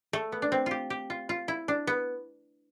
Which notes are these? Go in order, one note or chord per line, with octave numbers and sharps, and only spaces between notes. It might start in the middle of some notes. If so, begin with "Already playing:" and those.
A3
B3
D4
C4
F4 G4
G4
F4
F4
E4
D4
B3